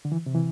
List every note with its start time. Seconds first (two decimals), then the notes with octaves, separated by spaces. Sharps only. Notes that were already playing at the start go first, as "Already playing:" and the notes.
0.05 D3
0.12 E3
0.26 C3
0.35 E3